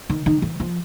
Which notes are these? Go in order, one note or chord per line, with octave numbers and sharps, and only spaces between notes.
D#3
D#3
E3
F3